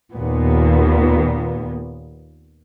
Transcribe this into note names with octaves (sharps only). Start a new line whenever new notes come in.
D#2 A#2 B3